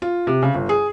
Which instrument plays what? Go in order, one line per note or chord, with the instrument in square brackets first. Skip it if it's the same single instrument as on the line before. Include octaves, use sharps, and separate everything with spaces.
[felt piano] F4
C3
C#3
G1
G#4